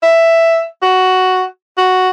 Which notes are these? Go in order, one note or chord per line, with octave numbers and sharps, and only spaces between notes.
E5
F#4
F#4